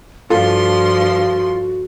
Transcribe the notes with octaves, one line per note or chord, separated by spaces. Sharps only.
G2 F3 F4 F#4 A4 C6